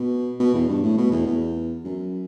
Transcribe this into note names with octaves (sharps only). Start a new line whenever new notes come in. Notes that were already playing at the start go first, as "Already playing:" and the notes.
Already playing: B2
B2
E2
G2
A2
B2
E2
E2
F#2